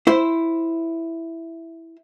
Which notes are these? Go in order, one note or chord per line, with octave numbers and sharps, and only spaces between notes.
E4 C5